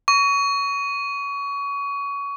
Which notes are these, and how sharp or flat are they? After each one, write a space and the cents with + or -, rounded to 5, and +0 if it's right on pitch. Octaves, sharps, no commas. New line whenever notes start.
C#6 +25